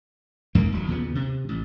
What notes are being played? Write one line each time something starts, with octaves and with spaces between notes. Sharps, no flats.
E2 G#2 A#3
D#1 F#3
D#2 A#2 C#3 B3
C3
A1